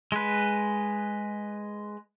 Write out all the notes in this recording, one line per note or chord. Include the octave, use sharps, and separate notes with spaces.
G#3 B4